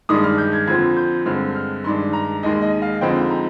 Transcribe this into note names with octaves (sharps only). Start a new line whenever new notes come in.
G2 D#3 G#3 D4 D#6
F6
G6
G#6
F2 D3 F3 C4 G#6
G6
G2 D3 G#3 C4 F6
F6
G2 D#3 G#3 D4 C6
A#5
D#2 D#3 G#3 D#5
D#5
F5
F2 D3 G#3 C4 D#4 G5
A#5